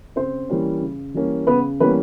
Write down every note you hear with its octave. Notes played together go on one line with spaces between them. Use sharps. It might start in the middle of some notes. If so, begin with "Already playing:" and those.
C#3 C4 C5
E3 G3 A#3 C#4
C#3
E3 G3 A#3 C#4
C#3 B3 B4
E3 G3 A#3 B3 C#4 B4